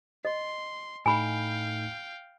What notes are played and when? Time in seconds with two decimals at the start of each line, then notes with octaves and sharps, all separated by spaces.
0.25 D#5 C6
1.06 A2 A3 D#4 F5 G5 G#5 B5